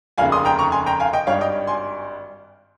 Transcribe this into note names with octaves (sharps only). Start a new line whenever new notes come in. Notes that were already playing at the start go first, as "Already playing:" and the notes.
F1 D#2 C#3 F5 G#5
C6 D#6
G5 A#5
A#5 C#6
G#5 C6
G5 A#5
F5 G#5
D#5 G5
G#1 G2 G3 C#5 F5
D#5 G5
G#5 C6